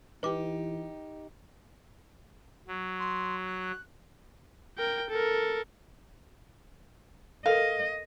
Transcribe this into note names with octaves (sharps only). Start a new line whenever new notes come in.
E3 D#4 G4 B4 D6
F#3
C6
F#6
A#4 G5
A4 A#4
A4 A#4 D#5 F5